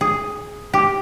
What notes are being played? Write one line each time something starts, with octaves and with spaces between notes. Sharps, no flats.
G#4
G4